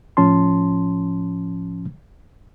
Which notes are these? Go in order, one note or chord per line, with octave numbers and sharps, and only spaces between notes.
A2 F3 C#4 A5 C6